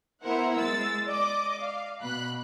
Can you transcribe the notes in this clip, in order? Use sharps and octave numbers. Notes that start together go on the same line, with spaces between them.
B3 E4 A#4 C5 F#5
G#3 E6 A6
D5 D#5 D6
F5
B2 B5 F#6